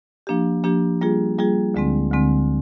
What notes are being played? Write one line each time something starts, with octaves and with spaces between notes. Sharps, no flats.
F3 A#3 D4 G4
F3 A#3 D4 G4
G3 A#3 F4 G#4
G3 A#3 F4 G#4
D2 D3 G#3 C4
D2 D3 G#3 C4